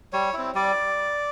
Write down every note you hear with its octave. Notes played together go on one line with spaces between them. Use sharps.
G3 C#5
C4 E4
G3 D5